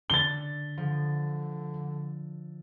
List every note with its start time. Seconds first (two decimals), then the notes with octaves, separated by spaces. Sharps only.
0.10 D3 A6 G7
0.78 D3 F3